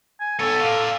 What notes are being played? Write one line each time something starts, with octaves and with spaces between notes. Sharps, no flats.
G#5
B3 A4 C#5
D5 F5